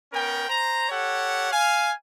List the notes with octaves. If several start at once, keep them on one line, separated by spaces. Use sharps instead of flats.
B3 C#4 A#4 G5
C5 A#5
G4 A4 C#5 F#5
F5 G#5